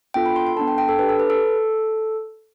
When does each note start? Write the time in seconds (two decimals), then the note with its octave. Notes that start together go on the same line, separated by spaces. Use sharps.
0.14 B3 D4 F4 A4 G5
0.26 B5
0.36 C6
0.47 C6
0.56 B3 D4 A4 A5
0.68 G5
0.78 G5
0.89 A4
0.99 D4 G4 B4
1.09 A4
1.20 B4
1.30 A4